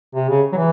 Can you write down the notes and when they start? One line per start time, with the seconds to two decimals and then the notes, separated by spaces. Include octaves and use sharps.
0.15 C3
0.29 C#3
0.52 F#3
0.56 E3